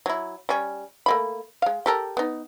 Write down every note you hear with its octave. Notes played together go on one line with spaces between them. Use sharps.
F#3 E4
G3 C#4
A3 A#3 B5
G#3 F5
G4 A4 A#4
B3 D#4